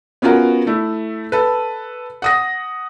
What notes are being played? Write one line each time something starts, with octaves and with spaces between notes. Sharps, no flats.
B3 C#4 F4 F#4 A#4
A3 E4
A4 B4
F#5 D#6 A#6